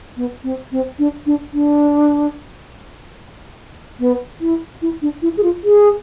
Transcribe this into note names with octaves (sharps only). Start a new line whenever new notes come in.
B3
C4
C4
D4
D4
D4
B3
E4
E4
D4
E4
G#4
F4
G#4